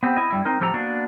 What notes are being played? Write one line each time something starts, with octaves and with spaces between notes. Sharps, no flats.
B3 C4 G4
E4 D#5
G2 G3 E4
C4 D#4 A#4
A2 F3 G4 A4 F#5 A#5
A#3 B3 D4 F#4